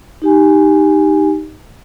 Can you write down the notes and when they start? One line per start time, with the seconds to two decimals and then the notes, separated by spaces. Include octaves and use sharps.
0.22 D#4 G4 G#5